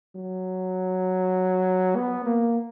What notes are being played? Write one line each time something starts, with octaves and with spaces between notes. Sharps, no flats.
F#3
B3
A#3